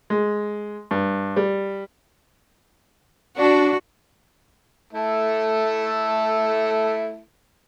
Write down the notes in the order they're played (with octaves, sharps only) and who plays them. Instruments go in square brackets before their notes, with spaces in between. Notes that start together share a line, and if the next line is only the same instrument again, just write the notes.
[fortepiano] G#3
G2
G3
[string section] D4 [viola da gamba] F#4
[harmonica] A3 E4 A4